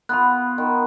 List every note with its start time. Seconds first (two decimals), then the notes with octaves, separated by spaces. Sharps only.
0.09 B3 F4 B5 F#6
0.58 D#3